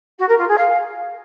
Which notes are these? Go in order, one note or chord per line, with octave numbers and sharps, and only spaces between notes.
F#4
A#4
F4
G#4
F5